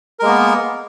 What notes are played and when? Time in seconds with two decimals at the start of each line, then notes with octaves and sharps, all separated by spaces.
0.19 A#4
0.22 G#3
0.25 A#3
0.28 B3